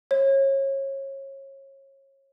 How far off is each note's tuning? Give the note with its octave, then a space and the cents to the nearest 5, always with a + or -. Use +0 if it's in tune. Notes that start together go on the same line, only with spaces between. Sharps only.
C#5 -30